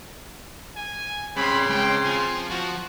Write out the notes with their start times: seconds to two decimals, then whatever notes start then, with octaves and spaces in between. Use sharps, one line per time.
0.76 G#5
1.36 G2 C#3 F3 C4 B5 C6
1.70 C#2 G5
2.04 F3 G#5
2.50 F3 F#4